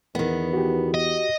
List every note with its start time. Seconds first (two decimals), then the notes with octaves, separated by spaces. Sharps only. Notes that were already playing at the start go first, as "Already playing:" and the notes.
0.15 E2 D#3 B3
0.53 F#4 G4
0.94 D#5